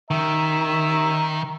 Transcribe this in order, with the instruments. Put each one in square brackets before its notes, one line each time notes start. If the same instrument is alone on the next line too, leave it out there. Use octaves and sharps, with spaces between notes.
[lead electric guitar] D#3 [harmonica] E5 A#5